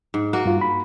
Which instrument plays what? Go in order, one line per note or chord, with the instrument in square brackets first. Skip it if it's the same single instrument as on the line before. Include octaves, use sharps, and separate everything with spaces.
[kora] G#2
A#3 F#4
[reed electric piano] G2 F4
B5